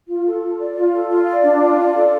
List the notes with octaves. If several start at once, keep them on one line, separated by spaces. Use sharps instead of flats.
F4
A4
F4
D5
F4
A4
F4
D5
D4
F4
D5
A4